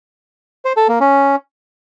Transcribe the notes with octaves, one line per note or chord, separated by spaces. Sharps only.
C5
A4
A#3
C#4